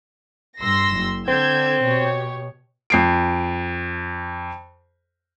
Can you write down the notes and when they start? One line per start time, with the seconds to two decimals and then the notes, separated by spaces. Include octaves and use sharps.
0.59 G2 C6 E6 A#6
0.93 F#1
1.28 D3 C4 E6 G6 G#6
1.84 B2 G4 C#5
2.90 F2 C7 D7